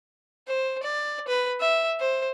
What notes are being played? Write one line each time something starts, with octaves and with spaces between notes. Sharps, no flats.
C5
D5
B4
E5
C5